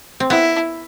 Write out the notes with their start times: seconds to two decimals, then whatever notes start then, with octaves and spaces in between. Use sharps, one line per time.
0.20 C4
0.30 B3 E4